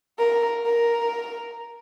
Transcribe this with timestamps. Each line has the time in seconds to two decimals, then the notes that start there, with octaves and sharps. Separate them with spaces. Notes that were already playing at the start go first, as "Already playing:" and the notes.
0.19 A#4
0.66 A#4